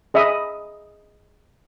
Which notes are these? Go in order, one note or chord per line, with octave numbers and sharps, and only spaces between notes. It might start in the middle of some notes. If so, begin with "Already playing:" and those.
G#4 D#5 E5 B5 D#6